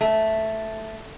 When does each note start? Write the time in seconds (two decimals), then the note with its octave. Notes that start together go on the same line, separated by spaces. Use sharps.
0.01 A3